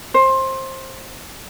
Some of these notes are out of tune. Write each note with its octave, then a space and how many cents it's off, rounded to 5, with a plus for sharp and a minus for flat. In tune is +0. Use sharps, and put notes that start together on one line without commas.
C5 +20